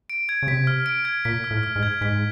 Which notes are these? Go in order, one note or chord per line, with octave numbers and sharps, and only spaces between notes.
D7
G#6
C#3
C3 B6
F6
D7
G#6
A#2 B6
F6
A2
F6
G#2
G#6
G#2 B6